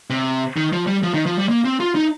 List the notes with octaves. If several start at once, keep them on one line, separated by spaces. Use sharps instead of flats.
C3
D#3
F3
G3
F3
D#3
F3
G3
A#3
C4
F4
D#4